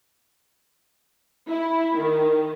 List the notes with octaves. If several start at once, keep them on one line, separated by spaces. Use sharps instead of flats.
E4
D#3